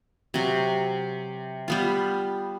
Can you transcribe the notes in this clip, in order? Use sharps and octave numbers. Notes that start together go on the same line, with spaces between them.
C3 F#3
G3 B3 F4